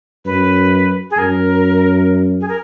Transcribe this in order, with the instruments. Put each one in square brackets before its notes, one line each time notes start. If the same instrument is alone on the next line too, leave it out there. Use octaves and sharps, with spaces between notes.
[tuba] F#2 [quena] B4
[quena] G#4
[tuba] F#2 [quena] A#4
[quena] G#4
A#4